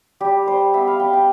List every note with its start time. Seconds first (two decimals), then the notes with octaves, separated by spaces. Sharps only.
0.20 G3 G4
0.47 G3 C5
0.74 B3 E5
0.87 F5
1.00 G3 G5
1.13 G5